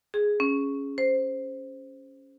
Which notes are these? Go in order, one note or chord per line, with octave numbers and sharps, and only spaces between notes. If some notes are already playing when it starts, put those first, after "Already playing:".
G#4
C#4
C5